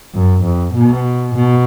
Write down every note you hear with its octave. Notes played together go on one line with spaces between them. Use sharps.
F#2
F2
B2
B2